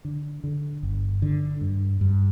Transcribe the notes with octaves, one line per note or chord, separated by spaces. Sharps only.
D3
D3
G1
D3
G2
G2